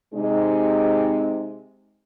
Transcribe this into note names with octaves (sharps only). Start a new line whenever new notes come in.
C3 G#3 D#4